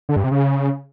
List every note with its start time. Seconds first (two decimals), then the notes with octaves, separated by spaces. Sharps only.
0.09 D3
0.16 G2
0.24 C3
0.31 C#3